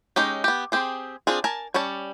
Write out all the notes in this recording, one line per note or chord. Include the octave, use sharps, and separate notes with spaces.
G#3 C#4 D#4 G4
B3 G4
C4 G4 G#4
C4 D4 F4 G#4
A#4 G#5 A5
G3 C#4 C#5 A5